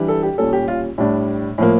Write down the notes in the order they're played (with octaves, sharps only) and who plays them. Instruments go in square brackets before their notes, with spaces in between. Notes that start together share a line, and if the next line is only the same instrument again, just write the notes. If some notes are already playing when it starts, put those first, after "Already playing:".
Already playing: [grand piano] E3 G3 D4
A4
G4
A#2 G3 C#4 A4
G4
F4
A2 G3 D4
A2 F3 A#3